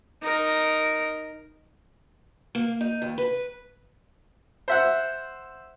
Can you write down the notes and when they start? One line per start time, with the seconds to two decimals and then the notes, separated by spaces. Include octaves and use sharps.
0.21 D#4 A#4
2.55 A#3
2.81 D#4
3.02 D#2
3.18 B4
4.68 C5 E5 F#5